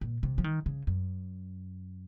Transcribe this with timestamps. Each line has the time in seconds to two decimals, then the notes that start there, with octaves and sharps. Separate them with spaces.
0.01 A#2
0.23 C3
0.38 F3
0.44 D#3
0.66 C#3
0.87 F#2